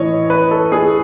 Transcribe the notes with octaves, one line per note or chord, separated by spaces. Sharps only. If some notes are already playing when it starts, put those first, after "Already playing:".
Already playing: A2 E3 C#5 D#5
B4
A4
G#4